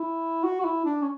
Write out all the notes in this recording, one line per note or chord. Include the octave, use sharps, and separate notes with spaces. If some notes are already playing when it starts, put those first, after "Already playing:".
Already playing: E4
F#4
F#4
E4
D4
C#4